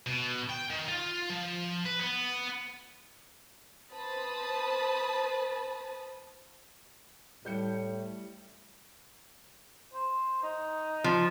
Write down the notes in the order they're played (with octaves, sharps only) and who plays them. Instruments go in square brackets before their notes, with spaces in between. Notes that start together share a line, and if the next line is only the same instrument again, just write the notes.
[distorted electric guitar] B2
G5
D#3
F4
F3
B4
B3
[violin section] B4 C5 A5 B5 D#6
[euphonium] A2 [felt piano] G3 G6 C#7
[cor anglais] C5
D#4
[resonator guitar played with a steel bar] F3